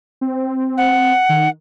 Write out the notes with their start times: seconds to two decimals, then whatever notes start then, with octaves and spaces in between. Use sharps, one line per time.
0.21 C4
0.77 F#5
1.29 D#3